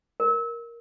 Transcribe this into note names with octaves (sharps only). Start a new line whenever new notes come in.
A#4